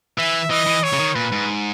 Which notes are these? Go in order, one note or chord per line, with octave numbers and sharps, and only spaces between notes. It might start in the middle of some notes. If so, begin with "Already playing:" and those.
E3 E5
E3 D#5
E3
C#5
C#3
D#3
A#2 B4
G#2